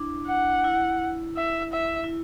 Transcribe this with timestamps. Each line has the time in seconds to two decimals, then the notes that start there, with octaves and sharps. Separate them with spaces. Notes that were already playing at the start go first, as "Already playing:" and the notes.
Already playing: D4 E4
0.27 F#5
0.64 E4
1.37 E5
1.73 E5
2.04 E4